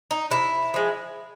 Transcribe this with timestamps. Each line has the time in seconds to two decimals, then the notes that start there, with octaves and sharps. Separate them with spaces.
0.11 D#4
0.31 C3 E4
0.74 F3 G#3